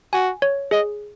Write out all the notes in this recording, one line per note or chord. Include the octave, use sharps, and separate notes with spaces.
F#4 G#5
C#5
G#4 D#5